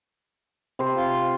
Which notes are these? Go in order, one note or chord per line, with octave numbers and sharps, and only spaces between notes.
C3 C5
F4